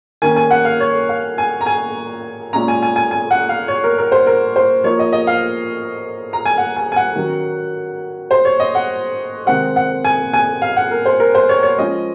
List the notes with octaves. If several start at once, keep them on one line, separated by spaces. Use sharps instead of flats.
D#3 A#3 C#4 G#5
G#5
F#5
F5
C#5
F5
G#5
A#5
G#5
A#2 G#3 C#4 A#5
G#5
G#5
G#5
G#5
F#5
F5
C#5
A#4
A#4
C5
A#4
C5
F3 A#3 D#4 C#5
D#5
D#5
F5
A#5
G#5
F#5
G#5
G#5
F#5
D#3 F#3 C#4
C5
C#5
D#5
F#5
C3 D#3 G#3 C4 F#5
F#5
G#5
G#5
F5
F#5
A#4
C5
A#4
C5
C#5
C#5
F3 G#3 C#4 D#5